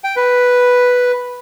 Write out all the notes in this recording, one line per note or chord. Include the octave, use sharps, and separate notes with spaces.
G5
B4